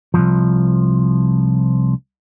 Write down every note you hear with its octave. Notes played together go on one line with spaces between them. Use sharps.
C2 G2 F3